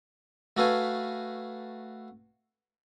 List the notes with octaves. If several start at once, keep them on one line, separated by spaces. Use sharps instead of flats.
A3 F#4 A4 B4 F5 G#5